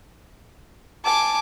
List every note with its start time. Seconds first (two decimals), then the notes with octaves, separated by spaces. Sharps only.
1.05 G#5 A5 D6